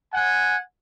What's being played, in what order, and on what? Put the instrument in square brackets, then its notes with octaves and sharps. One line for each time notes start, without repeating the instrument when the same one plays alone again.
[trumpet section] F#5 G#5